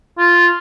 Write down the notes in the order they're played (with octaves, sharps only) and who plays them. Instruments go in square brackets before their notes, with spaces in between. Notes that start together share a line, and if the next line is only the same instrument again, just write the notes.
[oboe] F4